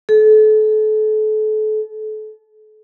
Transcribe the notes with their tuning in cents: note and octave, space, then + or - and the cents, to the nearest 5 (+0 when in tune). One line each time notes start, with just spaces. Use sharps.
A4 -35